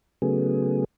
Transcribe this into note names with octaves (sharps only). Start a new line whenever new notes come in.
C#3 F#3 A3 B3 G#4